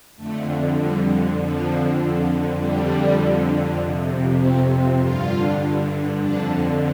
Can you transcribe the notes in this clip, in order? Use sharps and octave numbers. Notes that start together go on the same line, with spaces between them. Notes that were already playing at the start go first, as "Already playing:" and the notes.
F2 D3 A3
G3
F2 D3 F3
F2 D3 G3
F2 C3
C4
G2 D3 F4
F2 D3 D4